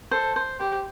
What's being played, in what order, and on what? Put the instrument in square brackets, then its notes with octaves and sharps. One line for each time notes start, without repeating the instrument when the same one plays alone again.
[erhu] A4 [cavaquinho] C5
[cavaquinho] C5
[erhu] G4 [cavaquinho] C5